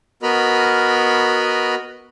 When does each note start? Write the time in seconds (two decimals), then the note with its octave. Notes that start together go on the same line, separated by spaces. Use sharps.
0.23 B3 F#4 A#4 D#5 B5 F6